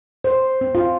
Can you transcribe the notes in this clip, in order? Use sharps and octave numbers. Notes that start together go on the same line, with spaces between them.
C5
C4
F4